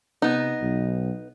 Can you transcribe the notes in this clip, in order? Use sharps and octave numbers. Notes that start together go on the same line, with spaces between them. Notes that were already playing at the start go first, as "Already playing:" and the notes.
C3 B3 D#4
B1